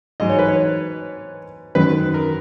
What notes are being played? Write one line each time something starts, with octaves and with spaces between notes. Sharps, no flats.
G#2 F#3 D#5
C#5
B4
C#5
F#2 D#3 F#3 B4
A#4